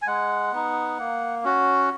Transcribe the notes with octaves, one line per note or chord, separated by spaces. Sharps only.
G#5
G#3 F#5
B3 D#4
A#3
C#4 F#4